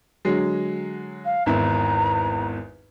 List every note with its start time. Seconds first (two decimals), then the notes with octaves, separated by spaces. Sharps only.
0.25 D3 F#3 G#3
1.25 F5
1.46 G#1 E2 E4 A#5